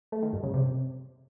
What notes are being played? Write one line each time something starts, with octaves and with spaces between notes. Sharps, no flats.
A3
D#3
G2
C#3
C3